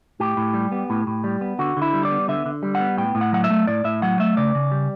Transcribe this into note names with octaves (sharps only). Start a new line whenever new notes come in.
A2 G4
A2
G3
B3
A2
A2
G3
B3
D3 F#4
D3 E4
G3
D5
B3
D3 E5
D3
G3
F#5
B3
A2 G5
A2
F#5
F#3 F#5
E5
A3
A2 D5
A2 E5
F#3 F#5
A3 E5
C#3 D5
C#3
G3